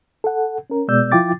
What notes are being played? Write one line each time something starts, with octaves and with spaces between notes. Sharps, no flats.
A4 F#5
C#4 A#4
B2 G#3 B3 D5 E6 G6
F3 E4 F4 G5 D6 A6